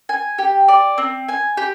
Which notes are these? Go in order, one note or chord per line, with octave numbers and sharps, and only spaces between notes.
G#5
G4
D5
C4
G#5
G4